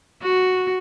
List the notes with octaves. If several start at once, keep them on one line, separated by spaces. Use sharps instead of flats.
F#4